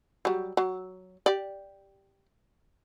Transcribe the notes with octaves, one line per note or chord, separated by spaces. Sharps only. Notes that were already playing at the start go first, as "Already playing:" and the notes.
F#3 G3
F#3
G4 D5